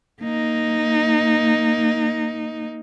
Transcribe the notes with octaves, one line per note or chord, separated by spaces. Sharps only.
A#3 D#4